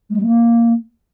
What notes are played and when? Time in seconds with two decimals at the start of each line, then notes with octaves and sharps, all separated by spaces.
0.10 G#3
0.16 G3
0.22 A#3